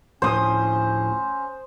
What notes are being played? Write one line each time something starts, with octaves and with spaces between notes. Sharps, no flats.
D2 A2 F3 C#4 C5 D#6